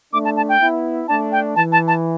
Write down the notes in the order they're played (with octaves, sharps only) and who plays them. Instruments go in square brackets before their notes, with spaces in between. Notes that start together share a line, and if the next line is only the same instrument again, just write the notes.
[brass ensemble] A3 D4 [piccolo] D6
[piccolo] A5
A5
G5
[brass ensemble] B3 E4
[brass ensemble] A3 D4 [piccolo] A5
[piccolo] G5
[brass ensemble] E3 [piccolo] A5
[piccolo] A5
A5